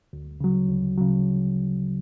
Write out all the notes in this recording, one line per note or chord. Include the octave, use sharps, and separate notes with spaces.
D2
C#3 F#3
D2
C#3 F#3